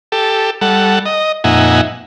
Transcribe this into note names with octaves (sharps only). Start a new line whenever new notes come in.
G4 A4
G3 A4 F#5
D#5
F2 A#2 D#4 E5 F#5 G#5